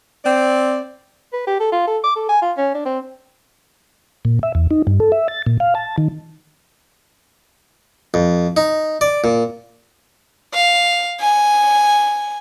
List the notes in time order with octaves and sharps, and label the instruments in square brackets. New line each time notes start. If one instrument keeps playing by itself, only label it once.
[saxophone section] C4 D5
[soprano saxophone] B4
G4
A4
F4
A4
D6
A4
G#5
F4
C#4
D4
C4
[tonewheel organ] A#2
E5
E2
D#4
G2
A4
E5
A6
A#2
F5
A5
D#3
[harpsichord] F2
D#4
D5
A#2
[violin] F5
G#5